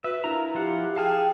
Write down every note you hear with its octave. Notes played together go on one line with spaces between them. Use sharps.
F#4 B4 E5
D4 E4 F4 A#4 A#5
F3 F4 G4 F#5
G#4 F5 G5 A5 F6